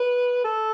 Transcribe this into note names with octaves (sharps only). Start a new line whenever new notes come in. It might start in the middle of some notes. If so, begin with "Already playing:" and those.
Already playing: B4
A4